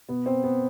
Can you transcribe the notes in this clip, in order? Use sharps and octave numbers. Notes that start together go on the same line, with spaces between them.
B2 B3
C4
B3